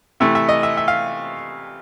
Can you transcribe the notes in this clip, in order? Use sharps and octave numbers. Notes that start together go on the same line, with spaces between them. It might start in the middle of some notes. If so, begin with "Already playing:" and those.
C3 E3 A3 E5
E5
D#5
E5
E5
F5